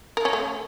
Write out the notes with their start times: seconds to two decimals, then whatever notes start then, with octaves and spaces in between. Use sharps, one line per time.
0.17 A#4
0.25 C#4
0.33 A3